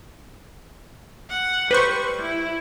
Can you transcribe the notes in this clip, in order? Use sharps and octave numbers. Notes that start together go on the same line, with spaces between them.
F#5
G3 B4 C5 C#6
E4